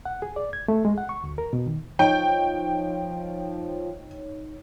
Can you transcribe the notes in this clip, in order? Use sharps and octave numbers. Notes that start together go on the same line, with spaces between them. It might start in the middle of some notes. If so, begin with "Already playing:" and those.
F#5
G#4
D5
G#6
A3
G#3
F#5
C#6
D2
A#4
B2
D#3
F3 D#4 C#5 G5